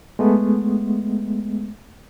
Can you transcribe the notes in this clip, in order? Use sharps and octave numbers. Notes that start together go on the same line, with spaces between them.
G#3 A3 B3